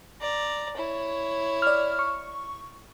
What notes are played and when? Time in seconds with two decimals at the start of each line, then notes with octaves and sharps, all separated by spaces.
0.21 D5 A#5
0.77 E4 C#5
1.62 D5 F6
1.99 C#6